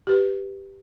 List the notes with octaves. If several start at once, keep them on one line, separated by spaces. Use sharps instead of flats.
G4 B4